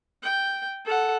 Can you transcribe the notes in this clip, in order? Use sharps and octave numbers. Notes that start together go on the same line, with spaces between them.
G5
A4 F#5